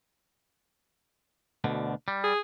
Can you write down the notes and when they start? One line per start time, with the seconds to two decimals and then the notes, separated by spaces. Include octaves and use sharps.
1.64 D2 B2 D3
2.08 G3
2.24 G#4